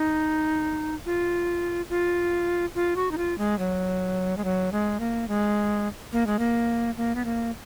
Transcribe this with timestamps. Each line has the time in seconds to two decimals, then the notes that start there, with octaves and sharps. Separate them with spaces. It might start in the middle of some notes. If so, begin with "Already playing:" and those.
Already playing: D#4
1.06 F4
1.90 F4
2.75 F4
2.96 F#4
3.11 D#4
3.18 F4
3.38 G#3
3.59 F#3
4.37 G#3
4.44 F#3
4.72 G#3
5.00 A#3
5.28 G#3
6.13 A#3
6.27 G#3
6.39 A#3
6.97 A#3
7.15 B3
7.25 A#3